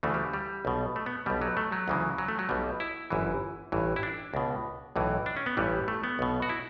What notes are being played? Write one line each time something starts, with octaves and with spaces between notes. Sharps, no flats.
D2 C#3 E3 A3
G3
G3
B1 B2
A3
B3
B1 B2 G3
F#3
A3
F#3
D2 C#3 E3
F#3
A3
F#3
B1 B2 G3
E4
G1 F#2 E3
A1 G2 E3
E4
D4
C#2 B2
B1 A2 E3
D4
C#4
B3
A1 G2 E3 G3
A3
B3
B1 B2
F#4
E4